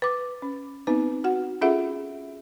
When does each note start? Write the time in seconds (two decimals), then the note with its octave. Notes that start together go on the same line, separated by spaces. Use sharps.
0.02 B4 D6
0.42 C#4
0.87 B3 C4 D#4 B4
1.24 F#4 F#5
1.61 C#4 F4 G#4 A4 E5 F#5